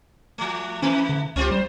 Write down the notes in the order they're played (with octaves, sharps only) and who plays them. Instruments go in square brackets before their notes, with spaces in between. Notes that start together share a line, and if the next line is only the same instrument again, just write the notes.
[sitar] F3 A3
[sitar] D#3 A3 B4 [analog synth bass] C#4
[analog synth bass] D3
[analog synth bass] C#2 [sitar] C4 F4 G4
[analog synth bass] G3 [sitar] C5